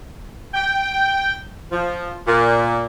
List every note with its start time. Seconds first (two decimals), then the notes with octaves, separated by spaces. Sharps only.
0.54 G5
1.71 F3
2.27 A#2